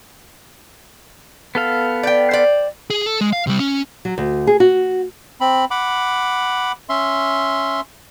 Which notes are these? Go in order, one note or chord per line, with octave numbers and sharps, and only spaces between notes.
B3 A4 F5
D5 G5
C5 D5
G#4
A4
G#3
F5
C3 G3
C#4
F#3
D2
G#4
F#4
C4 B5
F#5 B5 D6
C#4 E5 C6